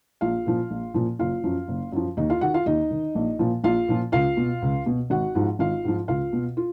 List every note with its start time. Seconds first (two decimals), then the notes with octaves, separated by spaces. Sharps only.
0.21 A#1 F4 F5
0.46 A#2 F3
0.70 A#1
0.94 A#2 F3
1.19 F#1 F4 F5
1.44 F#2 F3
1.68 F#1
1.92 F#2 F3
2.17 D#2 D#4 D#5
2.30 F4 F5
2.41 D#3 F#4 F#5
2.54 F4 F5
2.66 D#2 D#4 D#5
2.91 D#3
3.15 A#1
3.39 A#2 F3
3.64 A#1 F4 F5
3.88 A#2 F3
4.12 C#2 F4 F5
4.37 B2
4.62 C#2
4.86 B2
5.10 G#1 F#4 F#5
5.35 G#2 F3
5.59 G#1 F4 F5
5.84 G#2 F3
6.08 C#2 F4 F5
6.33 B2
6.57 F4